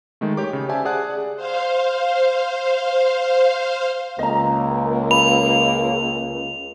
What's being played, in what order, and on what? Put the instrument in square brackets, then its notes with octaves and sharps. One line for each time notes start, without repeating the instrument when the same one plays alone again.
[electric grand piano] D#3 G#3 A3
G4 C#5 D6
C#3
G4 C5 D5 E5 G#5 A5
G#4 D5 F#5 A5 F#6
[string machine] C5 F5
[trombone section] C#2 [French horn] A#3 [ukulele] D#5 A#5
[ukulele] B5 [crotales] F7